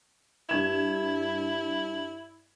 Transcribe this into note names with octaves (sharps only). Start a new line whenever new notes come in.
G2 E4 G#6 E7